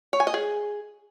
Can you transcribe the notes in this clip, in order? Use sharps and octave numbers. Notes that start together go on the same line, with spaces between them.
C#5
G#5
D#5
G#4